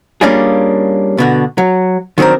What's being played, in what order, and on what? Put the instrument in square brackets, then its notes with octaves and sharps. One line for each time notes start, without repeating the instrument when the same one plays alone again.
[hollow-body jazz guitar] G3 A#3 C#4 D4 F4 G#4
B2 D3 F#4
F#3
D#3 F#3 C4 D4 A#4